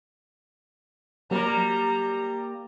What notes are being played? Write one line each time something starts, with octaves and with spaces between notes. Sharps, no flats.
F#3 G3 A#3 A#4 A#5